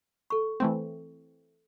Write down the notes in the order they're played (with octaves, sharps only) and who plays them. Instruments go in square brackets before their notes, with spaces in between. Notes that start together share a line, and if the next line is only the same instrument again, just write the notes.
[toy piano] A4 C#6
[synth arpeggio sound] E3 A3 C4